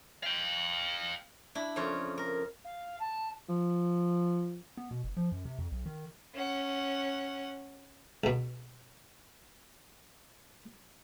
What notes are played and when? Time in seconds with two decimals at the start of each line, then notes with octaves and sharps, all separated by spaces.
0.24 F5 G5
1.55 D4 E4
1.76 F2 C#3 F4 C#5
2.18 A#4
2.65 F5
3.00 A5
3.49 F3
4.77 B3
4.91 B2
5.04 F#1
5.17 F3
5.32 F#2
5.45 C3
5.59 F2
5.71 B1
5.86 D#3
6.34 C#4 F#5
8.24 C#2 B2